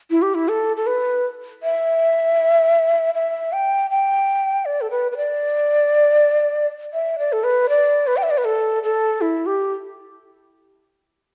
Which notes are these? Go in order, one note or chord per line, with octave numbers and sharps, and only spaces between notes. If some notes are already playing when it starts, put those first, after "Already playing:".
E4
G4
E4
A4
A4
B4
E5
E5
G5
G5
D5
A4
B4
B4
D5
E5
D5
A4
B4
D5
B4
G5
E5
D5
B4
A4
A4
E4
G4